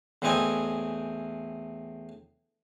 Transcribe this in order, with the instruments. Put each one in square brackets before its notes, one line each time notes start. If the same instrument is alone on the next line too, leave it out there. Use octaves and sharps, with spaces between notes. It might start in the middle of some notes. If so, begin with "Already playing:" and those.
[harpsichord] E2 A2 E3 C4 D#5 G#5